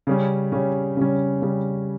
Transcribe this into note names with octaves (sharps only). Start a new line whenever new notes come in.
C#3 G3 C#4
C#3 G3 C#4
C#3 G3 C#4
C#3 G3 C#4